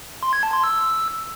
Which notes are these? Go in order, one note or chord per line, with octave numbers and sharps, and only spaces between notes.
C6
G#6
A5
C6
E6